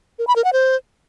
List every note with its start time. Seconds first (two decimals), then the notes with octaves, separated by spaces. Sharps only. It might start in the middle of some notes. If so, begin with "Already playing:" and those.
0.19 A#4
0.27 B5
0.36 A#4
0.44 F#5
0.53 C5